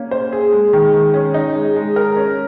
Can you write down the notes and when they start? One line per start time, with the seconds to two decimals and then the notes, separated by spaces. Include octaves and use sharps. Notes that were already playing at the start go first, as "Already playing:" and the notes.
Already playing: A#3 C#4
0.11 C5
0.32 G#4
0.53 G#3
0.73 D#3
0.94 D#3
1.14 C#4
1.34 D#4
1.55 G#3
1.76 G#3
1.96 A#4
2.16 C#4